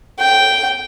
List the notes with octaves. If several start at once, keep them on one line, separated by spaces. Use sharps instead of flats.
G5